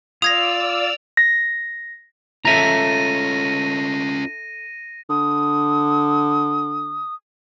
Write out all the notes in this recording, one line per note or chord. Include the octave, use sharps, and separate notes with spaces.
F4 D5 D#6 E6 G#6 A#6 F7
A#6
C#4 F4 A4 E5 A#5 A#6 D#7
D3 D#6